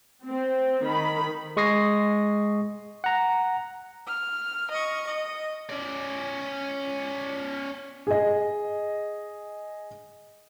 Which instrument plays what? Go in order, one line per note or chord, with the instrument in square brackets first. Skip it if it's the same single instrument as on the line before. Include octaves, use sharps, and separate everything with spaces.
[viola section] C4
D#3 B5
[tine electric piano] G#3 C#6 D#6 A#6 C7
F#5 A#5
[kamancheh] F6
D#5 C#6
D#5
[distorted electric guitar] C#4 D5
[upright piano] G#4 D#5